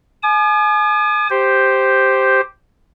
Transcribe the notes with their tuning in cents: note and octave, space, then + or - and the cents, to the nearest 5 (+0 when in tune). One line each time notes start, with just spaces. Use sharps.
G#5 +35 D#6 -45
G4 +0 C5 +0